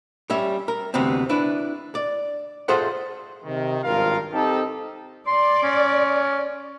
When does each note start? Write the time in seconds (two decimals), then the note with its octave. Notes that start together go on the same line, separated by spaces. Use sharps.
0.30 G3 C#4 E5
0.68 A#4
0.94 D2 C3 E3 B3 C4
1.29 D4 E4 B4
1.95 D5
2.68 F4 G#4 A4 C5 E5 F#5
3.45 C3 D#3
3.84 G#1 G2 F4 A#4 F5
4.33 C4 D#4 G4 A4
5.27 D5 C6
5.63 C#4